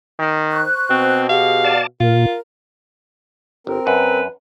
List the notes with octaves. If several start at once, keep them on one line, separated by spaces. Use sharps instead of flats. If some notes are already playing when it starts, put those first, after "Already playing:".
D#3
C5 C#6 F#6
B2 C4
G4 G#4 F5 F#5
D5 A5
A#2 F4 A#4
G1 C4 A#4
F#2 B4